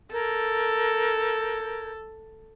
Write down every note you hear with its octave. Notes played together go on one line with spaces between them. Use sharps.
A4 A#4 G6 G#6